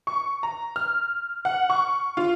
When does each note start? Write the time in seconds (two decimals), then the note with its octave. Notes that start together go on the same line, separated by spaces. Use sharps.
0.07 C#6
0.43 A#5
0.76 F6
1.45 F#5
1.70 C#6
2.17 F4